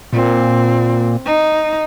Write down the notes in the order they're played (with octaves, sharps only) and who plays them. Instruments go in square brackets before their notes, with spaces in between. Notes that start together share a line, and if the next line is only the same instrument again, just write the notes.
[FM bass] A#2 [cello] C4
[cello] D#4